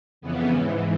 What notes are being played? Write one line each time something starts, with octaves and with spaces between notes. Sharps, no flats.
F2 C#3 E3 B3
G#2 E3 C#4